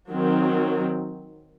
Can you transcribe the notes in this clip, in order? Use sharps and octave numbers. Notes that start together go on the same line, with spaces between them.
D#3 F#3 C4